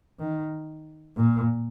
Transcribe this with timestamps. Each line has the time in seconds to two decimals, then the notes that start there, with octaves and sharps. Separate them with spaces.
0.19 D#3
1.17 A#2